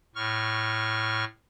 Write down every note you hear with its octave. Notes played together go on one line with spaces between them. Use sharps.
A2 C#6 F6